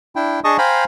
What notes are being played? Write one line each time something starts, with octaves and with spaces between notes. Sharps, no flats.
D4 E4 G5
D4 G#4 D#5 A5 C#6 D#6
C5 F5 G5 G#5 A#5 B5